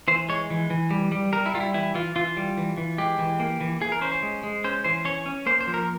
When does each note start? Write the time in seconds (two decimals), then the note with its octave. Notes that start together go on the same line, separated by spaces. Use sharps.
0.08 E3 C5
0.29 G#3 C#5
0.50 E3
0.70 E3
0.91 G3
1.12 G3
1.33 G3 A#4
1.46 E4
1.54 G3 F4
1.60 E4
1.74 E3 E4
1.94 E3 F4
2.16 E3 F4
2.37 G3
2.57 E3
2.77 E3
2.98 G#3 G4
3.18 E3
3.40 A#3
3.61 E3
3.81 E3 G#4
3.92 A#4
4.01 C#4 C5
4.12 C5
4.23 G#3
4.43 G#3
4.64 C#4 C5
4.84 E3 C5
5.05 C#4 C#5
5.26 C#4
5.46 A#3 C5
5.61 C5
5.67 F3
5.74 A#4